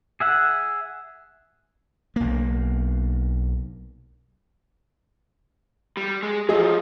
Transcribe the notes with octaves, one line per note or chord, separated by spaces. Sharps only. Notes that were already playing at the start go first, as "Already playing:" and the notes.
G#4 E5 F#5
B1 A#3
G3
G#3
F3 F#3 G#4 D#5